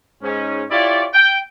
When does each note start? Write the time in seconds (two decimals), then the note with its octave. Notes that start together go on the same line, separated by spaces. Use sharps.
0.23 G#2 C#4
0.71 E4 F4 G4 C#5 D5
1.14 G5